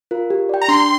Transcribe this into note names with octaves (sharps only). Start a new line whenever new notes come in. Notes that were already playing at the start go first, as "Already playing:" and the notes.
F4 A#4
G4
D5 G5
A#5
D4 C6